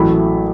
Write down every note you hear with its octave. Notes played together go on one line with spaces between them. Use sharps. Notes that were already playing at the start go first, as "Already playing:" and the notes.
Already playing: A1 A2 F#3 A3 B5